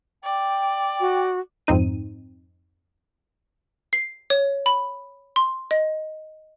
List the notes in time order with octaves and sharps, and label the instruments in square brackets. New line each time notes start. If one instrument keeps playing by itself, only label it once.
[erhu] D5 [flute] G5
[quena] F#4
[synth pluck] F2 G#2 C4 D#4 D#7
[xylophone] C7
C#5
B5
C6
D#5